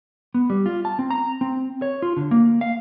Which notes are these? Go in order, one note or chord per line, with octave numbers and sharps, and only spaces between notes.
B3
G3
F4
A5
C4
A#5
C4
C#5
F4
D3
A#3
F5